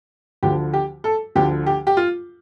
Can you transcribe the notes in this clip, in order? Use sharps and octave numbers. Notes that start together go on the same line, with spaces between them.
D2 D3 F3 G4
G4
A4
D2 D3 F3 G4
G4
G4
F4